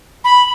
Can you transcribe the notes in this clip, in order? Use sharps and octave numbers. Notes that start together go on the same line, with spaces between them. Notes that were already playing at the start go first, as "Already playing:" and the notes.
B5